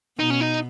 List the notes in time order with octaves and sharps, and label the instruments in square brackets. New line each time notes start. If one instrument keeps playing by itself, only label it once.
[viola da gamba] B2 [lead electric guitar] D#4
[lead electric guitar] C#4
D#4